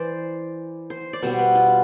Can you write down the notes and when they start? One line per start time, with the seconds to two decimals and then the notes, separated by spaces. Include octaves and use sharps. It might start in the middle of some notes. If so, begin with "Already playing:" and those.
Already playing: E3 C5 D5
0.90 C5
1.13 D5
1.22 B2 G3 B3 C5
1.38 B4
1.55 F4